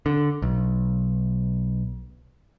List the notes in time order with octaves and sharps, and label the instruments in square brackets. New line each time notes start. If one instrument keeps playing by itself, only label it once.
[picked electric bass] D3
B1